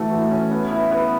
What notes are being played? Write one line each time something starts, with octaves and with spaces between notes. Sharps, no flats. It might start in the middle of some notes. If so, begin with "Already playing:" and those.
Already playing: E3 A3 F#4
E3
C#4
B3
E4
B3